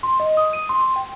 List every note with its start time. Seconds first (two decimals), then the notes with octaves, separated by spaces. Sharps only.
0.03 C6
0.20 D#5
0.37 D#6
0.53 D#7
0.69 C6
0.96 G5